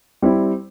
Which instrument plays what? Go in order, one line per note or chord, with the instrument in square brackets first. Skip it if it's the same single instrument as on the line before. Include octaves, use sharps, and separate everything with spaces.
[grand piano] G3 C4 E4